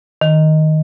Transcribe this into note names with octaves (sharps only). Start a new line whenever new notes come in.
D#3